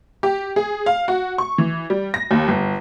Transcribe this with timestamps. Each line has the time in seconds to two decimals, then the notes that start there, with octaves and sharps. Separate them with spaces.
0.23 G4
0.56 G#4
0.86 F5
1.08 F#4
1.38 C#6
1.58 E3
1.90 G3
2.14 A#6
2.31 D#2
2.48 G1